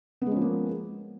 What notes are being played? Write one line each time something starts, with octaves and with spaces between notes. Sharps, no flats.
F3 G#3 A#3 B3 C#4